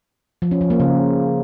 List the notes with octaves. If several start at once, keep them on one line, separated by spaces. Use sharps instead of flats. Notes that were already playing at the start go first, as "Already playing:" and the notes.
F3
C#4
F3
A#3
C#3